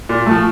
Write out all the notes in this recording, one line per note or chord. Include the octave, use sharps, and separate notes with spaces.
A#2
F3 A3